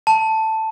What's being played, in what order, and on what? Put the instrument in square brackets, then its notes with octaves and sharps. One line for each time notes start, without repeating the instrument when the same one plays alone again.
[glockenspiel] A5